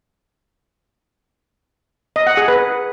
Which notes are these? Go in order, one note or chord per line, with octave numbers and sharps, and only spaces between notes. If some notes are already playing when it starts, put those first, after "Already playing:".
D#5
F#5
G#4
B4